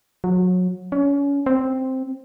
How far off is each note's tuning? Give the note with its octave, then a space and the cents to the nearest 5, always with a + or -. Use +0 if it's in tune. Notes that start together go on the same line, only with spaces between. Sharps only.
F#3 -25
C#4 +30
C4 +0